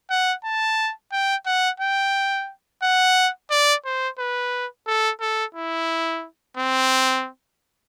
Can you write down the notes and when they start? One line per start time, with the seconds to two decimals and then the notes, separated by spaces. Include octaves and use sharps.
0.10 F#5
0.44 A5
1.12 G5
1.46 F#5
1.80 G5
2.82 F#5
3.50 D5
3.85 C5
4.18 B4
4.87 A4
5.21 A4
5.54 E4
6.57 C4